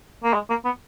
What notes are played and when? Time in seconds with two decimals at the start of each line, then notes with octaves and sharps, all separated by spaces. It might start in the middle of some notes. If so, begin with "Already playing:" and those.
0.24 A#3
0.34 G#3
0.50 A#3
0.65 B3